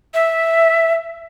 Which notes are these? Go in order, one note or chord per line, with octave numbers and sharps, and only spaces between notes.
E5